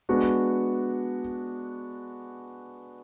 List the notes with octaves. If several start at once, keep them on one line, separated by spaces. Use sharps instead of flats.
G#3 B3 D4 F#4